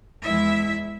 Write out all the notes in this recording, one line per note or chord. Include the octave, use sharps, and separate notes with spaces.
E2 G#3 E4 E5